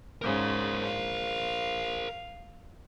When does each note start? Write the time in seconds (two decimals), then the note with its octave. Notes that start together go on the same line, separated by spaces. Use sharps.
0.22 G#2 C#3 A#4 C5
0.85 F5